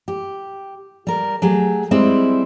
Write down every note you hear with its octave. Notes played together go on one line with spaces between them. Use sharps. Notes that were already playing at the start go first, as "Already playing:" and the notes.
G4
G3 A#4
F#3 A3 G4 G#4
G3 G#3 C4 E4